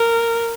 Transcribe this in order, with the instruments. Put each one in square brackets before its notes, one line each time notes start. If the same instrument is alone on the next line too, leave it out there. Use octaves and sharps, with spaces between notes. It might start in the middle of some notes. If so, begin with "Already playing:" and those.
Already playing: [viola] A#4